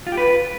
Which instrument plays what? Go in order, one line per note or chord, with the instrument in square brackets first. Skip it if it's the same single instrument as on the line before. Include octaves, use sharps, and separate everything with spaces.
[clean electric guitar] F4
G4
B4